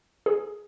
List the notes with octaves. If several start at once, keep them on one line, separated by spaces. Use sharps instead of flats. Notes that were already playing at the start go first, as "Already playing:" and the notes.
G#4